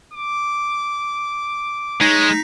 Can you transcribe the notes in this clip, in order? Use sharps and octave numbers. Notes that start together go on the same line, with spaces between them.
D6
G#3 D#4 C#5 A#6 B6